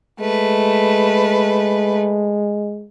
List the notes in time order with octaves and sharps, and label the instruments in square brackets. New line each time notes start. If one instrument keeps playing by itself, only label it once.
[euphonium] G#3 [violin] A3 B4